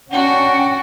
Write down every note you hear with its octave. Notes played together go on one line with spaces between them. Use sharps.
C#4 D4 F#4 F#5 G5